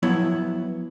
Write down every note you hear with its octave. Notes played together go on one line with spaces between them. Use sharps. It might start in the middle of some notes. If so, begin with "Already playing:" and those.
F3 F#3 B3 E4 C#5